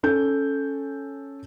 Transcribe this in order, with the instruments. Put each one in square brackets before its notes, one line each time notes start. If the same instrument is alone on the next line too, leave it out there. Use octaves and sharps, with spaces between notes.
[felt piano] C#4 A4 G6